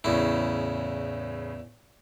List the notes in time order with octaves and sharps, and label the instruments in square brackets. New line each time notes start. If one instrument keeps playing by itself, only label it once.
[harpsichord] E2 E4 [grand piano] A2 C#3